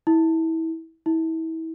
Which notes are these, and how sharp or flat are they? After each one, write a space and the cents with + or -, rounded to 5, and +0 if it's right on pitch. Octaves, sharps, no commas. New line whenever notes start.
E4 -25
E4 -30